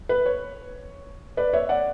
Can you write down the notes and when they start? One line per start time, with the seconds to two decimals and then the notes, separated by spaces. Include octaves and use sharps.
0.09 B4
0.26 C#5
1.37 B4 D5
1.53 C#5 E5
1.69 D5 F#5